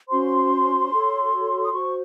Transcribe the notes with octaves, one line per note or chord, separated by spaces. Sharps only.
C#4 F#4 C5 C6
F#4 A4 C#5
D#6
F#4 C5 C#6